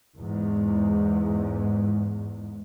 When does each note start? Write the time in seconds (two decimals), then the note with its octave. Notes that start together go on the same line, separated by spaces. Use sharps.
0.19 E2 G#2